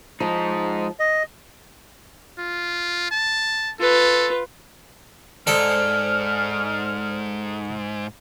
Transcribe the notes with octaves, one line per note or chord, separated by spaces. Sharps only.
F3 G#3 D#4
D#5
F4
A5
F4 A4 B4
G#2 A4 C5 D5 F6